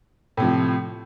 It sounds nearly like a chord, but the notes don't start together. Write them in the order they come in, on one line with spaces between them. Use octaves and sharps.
A2 C3 F3